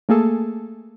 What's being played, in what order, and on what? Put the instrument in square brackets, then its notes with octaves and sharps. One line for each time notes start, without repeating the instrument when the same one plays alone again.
[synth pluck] A3 A#3 G#4 A4